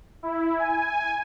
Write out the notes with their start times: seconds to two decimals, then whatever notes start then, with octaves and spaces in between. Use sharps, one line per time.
0.23 E4
0.59 G#5